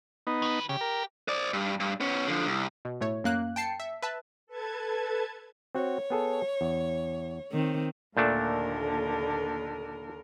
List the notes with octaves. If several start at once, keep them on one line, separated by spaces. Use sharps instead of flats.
B3 D#4
D#3 B4
C#3 G4
A#4
C5 D5
G2
G2
B3 C#4
D3 F3
C2
B2
A2 A3 C#5
F#2 A#3 F#6
G5 A5 C7 C#7
E5
B4 E5 A5
A4 B4 A5 G#6
C4 F#4 C#5 F#5
B3 G#4 A4
E2
D#3 C4
D#2 A#2 D3 A3 D4 A#4